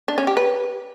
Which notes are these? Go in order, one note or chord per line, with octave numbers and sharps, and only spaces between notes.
D4
C#4
G4
B4